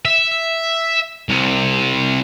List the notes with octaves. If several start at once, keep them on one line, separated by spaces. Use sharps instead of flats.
E5
C2 C3